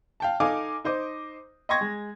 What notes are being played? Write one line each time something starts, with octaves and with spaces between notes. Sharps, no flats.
F5 G5 A5
D#4 A4 D#5 F5 G#5 D6
D#4 C5 D#5 D6
D#5 G5 C6 C#6 G#6 A#6
G#3